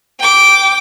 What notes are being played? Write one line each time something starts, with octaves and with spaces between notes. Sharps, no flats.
G5 D6